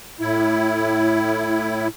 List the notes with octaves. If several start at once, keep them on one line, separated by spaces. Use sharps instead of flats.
A2 E4